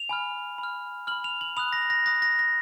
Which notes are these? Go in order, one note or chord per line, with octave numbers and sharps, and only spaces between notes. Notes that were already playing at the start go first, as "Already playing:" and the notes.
Already playing: F7
G#5 B5 F6
B5
F6
B5 F6 F#7
F7
F#7
B5 D#6 F#6 F7
A#6
A#6
B5 D#6 F#6 A#6
A#6
A#6